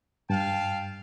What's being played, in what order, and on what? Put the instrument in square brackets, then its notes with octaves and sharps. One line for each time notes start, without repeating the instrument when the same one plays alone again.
[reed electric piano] G2 [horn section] F5 G5 A5